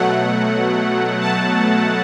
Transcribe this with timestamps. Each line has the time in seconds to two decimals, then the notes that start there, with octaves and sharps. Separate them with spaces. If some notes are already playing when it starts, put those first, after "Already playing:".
Already playing: B2 F#3 A3 F#5
1.21 A5